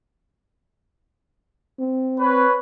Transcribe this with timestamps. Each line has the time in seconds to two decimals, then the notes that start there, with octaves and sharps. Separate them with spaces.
1.79 C4
2.20 B4 C#5